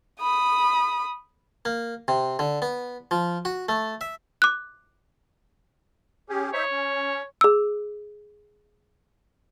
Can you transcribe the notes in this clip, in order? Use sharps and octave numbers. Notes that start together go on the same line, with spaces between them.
B5 D#6
A#3
C3
D3
B3
F3
F#4
A3
E5
D6 F#6
C#4 G4 G#4
D#4 C5 C#5 E5
C#4
G#4 E6